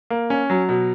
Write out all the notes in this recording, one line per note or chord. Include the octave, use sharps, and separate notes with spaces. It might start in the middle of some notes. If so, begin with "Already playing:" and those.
A#3
C#4
F#3
B2